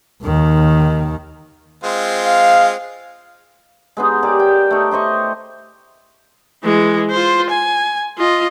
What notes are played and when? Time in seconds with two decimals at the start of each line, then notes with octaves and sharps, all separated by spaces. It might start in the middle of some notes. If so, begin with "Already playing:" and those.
0.23 D#2 D#3
1.84 G#3 C4 F4
2.25 F5
3.97 G#3 B3 D#4
4.22 G4 G#4 A#4 D5
4.40 G5
4.71 A3 D#4
4.91 E4 C5 D#5 C#6
6.63 E3 G#3
7.11 F4 C5
7.50 G#5
8.18 F4 D#5